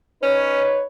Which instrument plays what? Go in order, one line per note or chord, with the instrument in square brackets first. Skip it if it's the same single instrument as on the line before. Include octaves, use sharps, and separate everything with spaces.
[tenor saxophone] C#4 [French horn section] D#4 B4 C#5